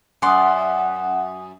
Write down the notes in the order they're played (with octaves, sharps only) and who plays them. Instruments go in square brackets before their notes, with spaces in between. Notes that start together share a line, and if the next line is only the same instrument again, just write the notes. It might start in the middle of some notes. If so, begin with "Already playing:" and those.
[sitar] F#2 [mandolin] D5 C6 [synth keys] F#5 [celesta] G#5 D#6